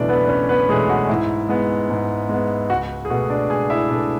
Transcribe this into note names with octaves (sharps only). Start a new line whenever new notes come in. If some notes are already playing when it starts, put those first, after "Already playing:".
Already playing: F#1 E2 B2 A3 D4 E4 D5 E5
B3 B4
F#1 C#4 C#5
B3 B4
E2 B2 G#3 A3 G#4
F#4
G#2 E4
G#3 B3
G#2
G#3 B3
C#2 F#4
G#4
B2 A3 F#4
D4 D5
C#2 G#4 G#5
E4 E5
B2 A3 D4 D5